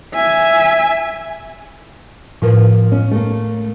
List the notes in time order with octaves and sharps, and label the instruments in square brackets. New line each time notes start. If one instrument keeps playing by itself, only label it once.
[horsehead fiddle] E5 G#5
[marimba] A2 A#4 B4 [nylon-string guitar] F3
[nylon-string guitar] C#4
A3 A#3